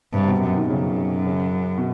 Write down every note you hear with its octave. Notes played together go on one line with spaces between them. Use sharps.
G2 C3
C3
B2
F#2
D#3
F#2 C#3
C#3
B2